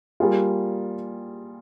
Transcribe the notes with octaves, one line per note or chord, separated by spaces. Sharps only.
G3 A#3 F4 G#4